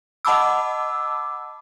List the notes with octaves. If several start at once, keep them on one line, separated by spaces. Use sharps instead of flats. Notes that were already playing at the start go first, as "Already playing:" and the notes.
D#5 F#5 A5 B5 D6 E6